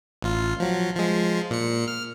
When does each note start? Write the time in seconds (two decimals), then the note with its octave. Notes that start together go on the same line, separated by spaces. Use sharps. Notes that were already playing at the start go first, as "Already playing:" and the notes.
0.22 A1 F4
0.60 F3 F#3
0.95 F3 G#3
1.51 A#2 C#7
1.88 F6